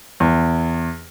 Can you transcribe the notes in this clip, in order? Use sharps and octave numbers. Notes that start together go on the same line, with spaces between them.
E2